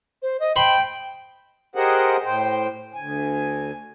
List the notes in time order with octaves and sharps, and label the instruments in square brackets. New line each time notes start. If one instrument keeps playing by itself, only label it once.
[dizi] C5
D#5
[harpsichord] C5 B5 C6 [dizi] G5
[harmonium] G4 G#4 A#4 C5 D#5 F#5
A2 C5 G5
D2 G#5